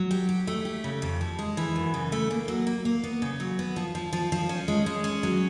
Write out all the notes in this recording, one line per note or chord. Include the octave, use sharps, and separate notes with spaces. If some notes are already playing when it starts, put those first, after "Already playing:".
Already playing: F#3
G4
G4
A3
G4
C#3
F2
F3
G#3
E3
F#2
C#3
A3
A#3
F#3
A#3
A#3
B3
C#3
F#3
B3
F3
F3
F3
F3
C#4
G#3
G#3
C#4
F#3